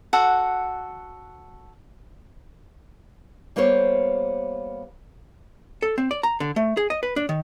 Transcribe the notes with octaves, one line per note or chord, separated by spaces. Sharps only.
F#4 A4 F#5
G3 A#3 B3 C5 C#5
A4
C4
D5
A#5
D3
A3
G#4
D#5
B4
D4
D#3